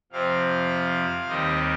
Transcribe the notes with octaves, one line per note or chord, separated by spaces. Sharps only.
F2 C3 F3 C4 F5
D#2 D#3 G3 C4 D#5